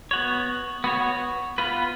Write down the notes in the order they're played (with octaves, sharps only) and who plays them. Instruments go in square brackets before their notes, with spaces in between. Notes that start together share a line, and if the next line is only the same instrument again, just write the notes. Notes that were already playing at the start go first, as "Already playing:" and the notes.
[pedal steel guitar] B3 F#4 C#5
B3 F#4 C#5
B3 F4 B4